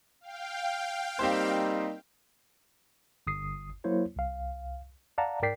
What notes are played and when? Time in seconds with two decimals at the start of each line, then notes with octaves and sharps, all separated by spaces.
0.21 F5 G5
1.19 G3 A#3 C4 D#4 G4 C5
3.27 G1 D#6 C7
3.84 F#3 A#3 E4 C5 C#5
4.16 C2 F5
5.18 D5 F5 F#5 A5 A#5
5.42 G#2 A#4 D5 G5 B6 C7